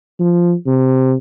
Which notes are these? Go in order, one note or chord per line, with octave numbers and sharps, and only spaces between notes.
F3
C3